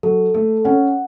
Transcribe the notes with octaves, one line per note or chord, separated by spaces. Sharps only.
F#3 A4
A3 A4
C#4 F#5